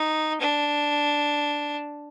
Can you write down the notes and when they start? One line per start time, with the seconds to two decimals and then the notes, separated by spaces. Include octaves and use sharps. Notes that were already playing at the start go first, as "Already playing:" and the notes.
Already playing: D#4
0.41 D4